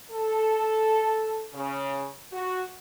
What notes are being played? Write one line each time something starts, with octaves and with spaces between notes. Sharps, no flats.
A4
C#3
F#4